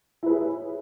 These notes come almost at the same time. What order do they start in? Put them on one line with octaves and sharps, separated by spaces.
E4 B4 G#4 C#5